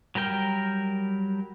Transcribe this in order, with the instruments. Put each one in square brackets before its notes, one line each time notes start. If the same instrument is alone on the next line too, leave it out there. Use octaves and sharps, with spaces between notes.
[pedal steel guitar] F#3 G3 A#4 G5 F6